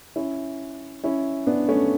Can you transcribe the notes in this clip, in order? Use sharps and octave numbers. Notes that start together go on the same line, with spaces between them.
C#4 E4
C#4 E4
B3 D4
A3 C#4